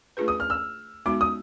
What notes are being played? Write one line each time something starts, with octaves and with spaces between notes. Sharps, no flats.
A3 D4 F4 G#4 B4
D#6
F6
E6
G#3 B3 D#4 F#4 D6
D#6